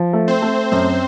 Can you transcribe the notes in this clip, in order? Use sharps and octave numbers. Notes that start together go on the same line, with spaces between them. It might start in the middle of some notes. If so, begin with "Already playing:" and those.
Already playing: F3
A3
C4 C5
A3
F#2 C4 C5